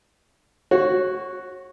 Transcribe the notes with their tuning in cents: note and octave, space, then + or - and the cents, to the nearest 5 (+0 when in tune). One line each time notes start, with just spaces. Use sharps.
F#4 +0 C#5 -35